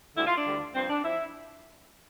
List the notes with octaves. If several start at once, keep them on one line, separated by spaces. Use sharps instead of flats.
D2 D3 G3 E4
F4
D4
D2 D3 G3
G2 F3 C4
D4
F3 E4